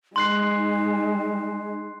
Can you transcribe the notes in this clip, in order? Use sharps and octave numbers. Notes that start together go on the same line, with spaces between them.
G#3 D#4 C6 F#6 C7